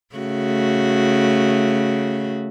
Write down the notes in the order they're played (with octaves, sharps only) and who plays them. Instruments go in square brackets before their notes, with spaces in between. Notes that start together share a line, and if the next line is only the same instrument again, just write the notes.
[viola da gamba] C#3 A3 F#4